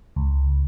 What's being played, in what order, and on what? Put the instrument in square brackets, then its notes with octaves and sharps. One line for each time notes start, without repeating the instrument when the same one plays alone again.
[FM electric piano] C#2